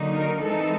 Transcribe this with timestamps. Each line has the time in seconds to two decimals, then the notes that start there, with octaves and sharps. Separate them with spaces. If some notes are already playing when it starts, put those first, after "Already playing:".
Already playing: D3 F#3 A#3 D#4
0.14 A#4
0.42 E3 G#3 C4 D#4 A4